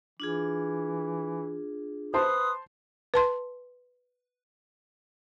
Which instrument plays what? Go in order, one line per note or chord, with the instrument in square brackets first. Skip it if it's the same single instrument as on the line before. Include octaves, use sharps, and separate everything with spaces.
[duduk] E3 [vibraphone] D4 F4 G#4
[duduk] B4 [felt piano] C5 A5 C6 [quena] D#6
[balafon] B4 A5 C6